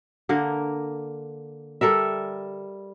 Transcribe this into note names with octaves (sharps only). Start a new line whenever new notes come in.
D3 A#3 A#4
G3 A4 A#4 E5